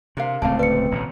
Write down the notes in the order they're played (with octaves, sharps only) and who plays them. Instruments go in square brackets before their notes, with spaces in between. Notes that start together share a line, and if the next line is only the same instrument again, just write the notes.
[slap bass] C3 [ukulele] D4 A#4 F5
[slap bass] D1 C#2 A3 [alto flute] C4 [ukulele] D5 F5 [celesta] A5
[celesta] B4 C#7 [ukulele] D5
[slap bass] A1 B2 D3